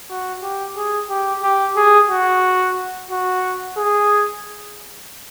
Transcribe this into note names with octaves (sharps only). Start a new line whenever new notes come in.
F#4
G4
G#4
G4
G4
G#4
F#4
F#4
G#4